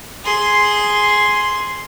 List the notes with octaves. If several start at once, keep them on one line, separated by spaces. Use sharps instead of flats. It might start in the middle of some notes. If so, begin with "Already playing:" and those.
G#4 C6